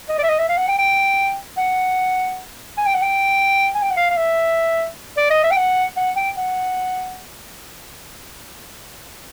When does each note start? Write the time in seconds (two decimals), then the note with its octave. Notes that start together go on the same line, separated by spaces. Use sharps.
0.09 D#5
0.18 D5
0.23 E5
0.29 D#5
0.38 E5
0.49 F5
0.58 F#5
0.68 G5
0.78 G5
1.58 F#5
2.78 G#5
2.86 G5
2.94 F#5
3.02 G5
3.75 G#5
3.82 G5
3.90 F#5
3.97 F5
4.10 F5
4.17 E5
5.17 D5
5.30 D#5
5.44 E5
5.51 G5
5.56 F#5
5.97 F#5
6.16 G5
6.37 F#5